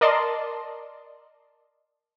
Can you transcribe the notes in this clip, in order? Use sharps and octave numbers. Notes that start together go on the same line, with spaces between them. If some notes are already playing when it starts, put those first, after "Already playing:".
A#4 D5 D#5 A5 C6